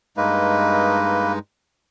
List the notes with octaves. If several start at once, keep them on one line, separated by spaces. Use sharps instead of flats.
G2 G#3 A#3 D#4 B4